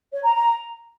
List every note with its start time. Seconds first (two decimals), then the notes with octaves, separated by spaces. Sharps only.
0.13 C#5
0.24 A#5
0.34 A#5